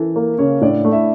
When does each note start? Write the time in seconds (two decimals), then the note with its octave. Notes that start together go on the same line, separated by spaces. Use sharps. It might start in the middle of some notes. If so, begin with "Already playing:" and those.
Already playing: E3 C#4 A4 A#4
0.16 A#3 A#4
0.38 C#3 C#4 C#5
0.61 A2 D4 D5
0.85 A3
0.92 E4 E5